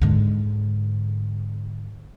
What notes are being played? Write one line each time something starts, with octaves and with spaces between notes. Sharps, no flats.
G#2 D3